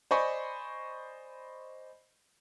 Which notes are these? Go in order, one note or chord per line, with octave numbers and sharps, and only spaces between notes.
C5 D5 D#5 G#5 B5 C#6